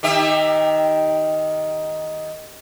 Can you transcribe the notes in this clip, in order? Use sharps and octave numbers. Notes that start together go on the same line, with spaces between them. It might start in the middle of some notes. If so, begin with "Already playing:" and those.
D#3 G4 E5